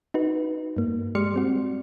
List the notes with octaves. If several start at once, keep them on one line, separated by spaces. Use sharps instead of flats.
D#4 F#4 B4
G2 A#3
G#3 G4 D5 C6 F6 C#7
G3 C4 F#4